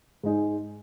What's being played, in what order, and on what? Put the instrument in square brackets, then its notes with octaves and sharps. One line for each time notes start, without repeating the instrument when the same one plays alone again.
[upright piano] G#2 G#3 D#4 G#4